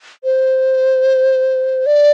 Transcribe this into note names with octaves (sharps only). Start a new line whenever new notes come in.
C5
D5